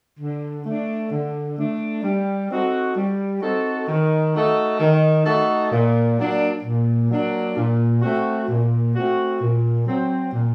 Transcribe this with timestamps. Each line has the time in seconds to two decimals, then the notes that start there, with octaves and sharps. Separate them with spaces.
0.19 D3
0.65 A3 D4
1.11 D3
1.57 A3 D4
2.03 G3
2.50 C4 D#4 F#4 A4
2.96 G3
3.42 C4 D#4 F#4 A4
3.88 D#3
4.35 A3 D#4 F#4 A4
4.80 D#3
5.26 A3 D#4 F#4 A4
5.72 A#2
6.19 F#3 A#3 D4
6.64 A#2
7.10 F#3 A#3 D4
7.57 A#2
8.02 A3 C4 F#4
8.49 A#2
8.95 A3 C4 F#4
9.41 A#2
9.87 F#3 C4
10.33 A#2